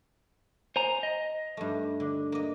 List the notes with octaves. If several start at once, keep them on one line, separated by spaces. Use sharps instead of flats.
C5 G#5 A#5
D#5
G2 A3
D3
A#3 D#5